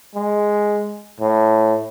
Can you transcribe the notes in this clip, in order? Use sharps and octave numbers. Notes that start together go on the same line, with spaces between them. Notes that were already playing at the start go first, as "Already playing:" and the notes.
G#3
A2